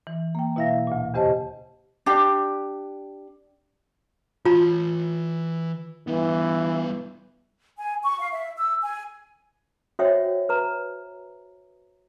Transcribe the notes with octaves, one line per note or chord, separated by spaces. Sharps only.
E3
A#3 G5
B2 E4 E5 F5 A#6
D2 A#2
E2 C#3 G4 C5 D#5 A5
D4 G4
E3 F4 A5 A#5
E3 G3 B3
G#5
C#6
F5
E5
E6
G#5
F#4 C5 C#5 E5 F#5 G5
B4 A#5